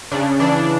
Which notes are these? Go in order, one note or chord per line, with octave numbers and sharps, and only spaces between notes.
C#3 D4
E3 D4